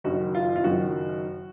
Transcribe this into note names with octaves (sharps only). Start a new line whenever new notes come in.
F#1 F#2 D#3 F#4
F4
F4
F#1 F#2 D#3 F#4